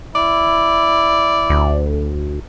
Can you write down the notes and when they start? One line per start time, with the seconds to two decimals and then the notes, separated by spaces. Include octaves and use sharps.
0.15 E4 D5
1.50 D2